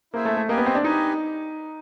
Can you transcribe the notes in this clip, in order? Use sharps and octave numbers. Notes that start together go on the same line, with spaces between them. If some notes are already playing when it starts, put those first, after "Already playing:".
A#3 E4 G#4 C5 E5 G#5
A3
A3
A#3 G4 B4 D#5 G#5
B3
C4
D4
D#4 G4 B4 D#5 G#5